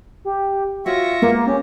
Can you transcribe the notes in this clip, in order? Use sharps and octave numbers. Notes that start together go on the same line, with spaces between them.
G4
F4 F#4 C#5 E5 C#6 A#6
G#3 A#3 B3
C#4 G4